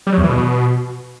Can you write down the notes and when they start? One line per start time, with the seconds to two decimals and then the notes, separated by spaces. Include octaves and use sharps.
0.07 G3
0.12 F#3
0.18 E2
0.24 E3
0.29 B2